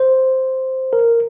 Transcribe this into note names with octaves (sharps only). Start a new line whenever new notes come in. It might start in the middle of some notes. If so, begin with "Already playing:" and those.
Already playing: C5
A#4